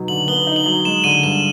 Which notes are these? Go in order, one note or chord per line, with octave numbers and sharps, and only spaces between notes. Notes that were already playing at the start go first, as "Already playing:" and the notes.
Already playing: B2 F#3 D#4
D3 F#7
B3 G7
D#4
F#7
F#3
G#3 E7
D3 D#7
G2 E7